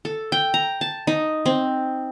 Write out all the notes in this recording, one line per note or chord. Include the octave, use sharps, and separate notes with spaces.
A4
G5
A#5
A5
D#4
C4